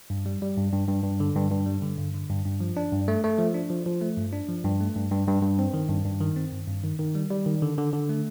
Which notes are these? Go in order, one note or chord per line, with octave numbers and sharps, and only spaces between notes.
G2
G3
G3
G2
G2
G2
G2
D3
G2
G2
G3
D3
G2
D3
G2
G2
F3
D4
G2
A3
A3
F3
D4
F3
F3
A3
G2
D4
F3
G2
A3
G2
G2
G2
G2
C4
D#3
G2
G2
D#3
C4
G2
G2
D#3
D#3
G3
G3
D#3
D3
D3
D3
A3